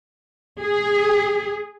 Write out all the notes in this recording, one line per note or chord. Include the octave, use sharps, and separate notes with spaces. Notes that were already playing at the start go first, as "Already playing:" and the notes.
G#4